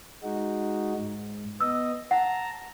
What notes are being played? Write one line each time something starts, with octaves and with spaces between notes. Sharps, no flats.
G#3 D#4 F#4
G#2
B3 D#5 E6
F#5 A5 A#5